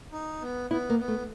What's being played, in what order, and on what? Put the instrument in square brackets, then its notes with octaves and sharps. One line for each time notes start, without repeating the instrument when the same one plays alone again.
[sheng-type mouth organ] D#4
B3
[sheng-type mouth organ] B3 [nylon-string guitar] E4
[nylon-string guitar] A#3
[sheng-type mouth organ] B3
[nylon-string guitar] A3